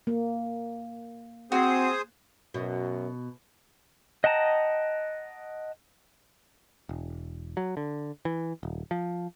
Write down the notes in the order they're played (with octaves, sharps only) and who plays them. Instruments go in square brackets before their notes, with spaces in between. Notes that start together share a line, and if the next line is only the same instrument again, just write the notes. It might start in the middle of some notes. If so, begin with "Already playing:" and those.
[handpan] A#3
[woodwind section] C4 [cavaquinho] F#4 [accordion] G#4 C5 D#6
[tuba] F#2 [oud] B2
[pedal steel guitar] D#5 F#5 G5 A5 A#5
[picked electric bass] E1
F#3
D3
E3
D#1
F3